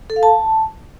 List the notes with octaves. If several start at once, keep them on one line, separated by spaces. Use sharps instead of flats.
A4
F5
A5